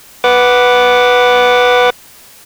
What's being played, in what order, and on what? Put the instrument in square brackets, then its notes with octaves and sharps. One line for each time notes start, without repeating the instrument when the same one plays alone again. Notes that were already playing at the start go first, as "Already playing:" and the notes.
[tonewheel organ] B4 F#5 D6